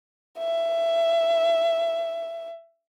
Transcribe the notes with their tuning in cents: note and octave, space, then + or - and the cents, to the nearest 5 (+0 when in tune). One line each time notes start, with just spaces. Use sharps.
E5 +15